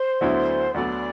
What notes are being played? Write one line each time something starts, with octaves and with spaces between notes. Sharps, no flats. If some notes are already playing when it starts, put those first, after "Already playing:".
Already playing: C5
D2 D3 F#3 B3 E4
D2 D3 F#3 B3 D5